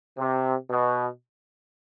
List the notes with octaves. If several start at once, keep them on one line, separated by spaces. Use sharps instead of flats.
C3
B2